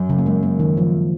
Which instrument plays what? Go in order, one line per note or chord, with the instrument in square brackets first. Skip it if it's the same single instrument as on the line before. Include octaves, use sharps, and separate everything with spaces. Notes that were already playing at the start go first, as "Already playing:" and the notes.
Already playing: [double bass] F#2
[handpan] C#3
A#3
G#3
A#3
D#3
F3